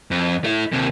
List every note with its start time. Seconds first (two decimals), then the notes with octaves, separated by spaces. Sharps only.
0.11 F2
0.44 A3 E4
0.72 D#2 C3